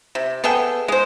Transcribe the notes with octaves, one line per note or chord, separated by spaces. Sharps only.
C3
B3 G#4 A4 G5
G#3 C5